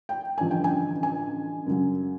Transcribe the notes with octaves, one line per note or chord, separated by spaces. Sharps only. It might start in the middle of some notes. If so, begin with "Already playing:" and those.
G5
A1 G2 D3 F3 G#5
G5
G#5
G#5
F#2 C#3 F#3